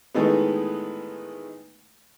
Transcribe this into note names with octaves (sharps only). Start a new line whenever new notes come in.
A2 D#3 E3 G#3 A3 B3